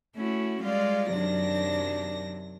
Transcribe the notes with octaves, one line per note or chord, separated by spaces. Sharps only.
A3 C#4 E4 F#4
G3 G#3 F4 D5 F5
F#2 C3 D#3 F#3 D4 A#6